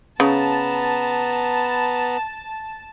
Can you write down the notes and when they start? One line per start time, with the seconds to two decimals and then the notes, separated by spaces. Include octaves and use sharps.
0.20 C#3 B3 B4 A5 A#5